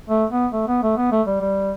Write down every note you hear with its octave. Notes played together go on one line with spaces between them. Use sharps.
A3
B3
A3
B3
A3
B3
A3
G3
G3